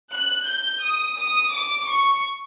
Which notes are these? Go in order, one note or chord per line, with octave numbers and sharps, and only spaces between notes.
F#6
G6
D#6
D#6
D6
C#6